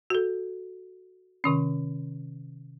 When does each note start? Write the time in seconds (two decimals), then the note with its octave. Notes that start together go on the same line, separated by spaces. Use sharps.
0.10 F#4 A4
1.44 C3 D#3 C#4